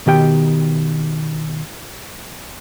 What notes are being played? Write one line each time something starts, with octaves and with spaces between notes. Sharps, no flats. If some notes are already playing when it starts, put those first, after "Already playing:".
B2 D#3 G4 G5